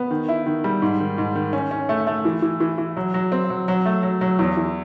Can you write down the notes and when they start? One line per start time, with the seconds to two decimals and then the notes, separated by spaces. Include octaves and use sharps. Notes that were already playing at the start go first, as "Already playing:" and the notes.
Already playing: B3
0.11 D#3
0.28 E4
0.46 D#3
0.64 G3
0.82 G#2
1.00 D#3
1.18 G#2
1.35 D#3
1.53 C#4
1.71 C#4
1.89 A3
2.07 A3
2.25 E3
2.42 E3
2.60 E3
2.78 E3
2.97 F#3
3.14 F#3
3.32 C4
3.50 F#3
3.68 F#3
3.85 A3
4.03 F#3
4.21 F#3
4.39 E2
4.57 E3